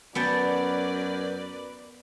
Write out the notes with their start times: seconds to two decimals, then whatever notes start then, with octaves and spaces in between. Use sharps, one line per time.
0.15 F#2 B3 A#4 B4 D5 G5 A5